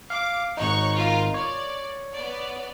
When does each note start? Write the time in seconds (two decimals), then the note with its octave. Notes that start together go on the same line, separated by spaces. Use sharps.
0.10 F5 D6
0.57 G#1 D#4 C#5 C#6 F#6
0.95 F4 A#4 F5
1.34 C#5 D5
2.13 B3 D5